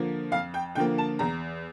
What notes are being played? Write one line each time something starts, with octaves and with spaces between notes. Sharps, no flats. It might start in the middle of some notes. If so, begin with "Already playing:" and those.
Already playing: D3 F3 A#3
F2 F5
G5
D3 F3 A#3 G5
A5
E2 A#5